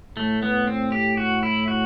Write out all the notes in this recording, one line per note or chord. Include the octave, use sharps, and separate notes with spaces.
A2 A3
B3
C4
G4
F#4
E4
F#4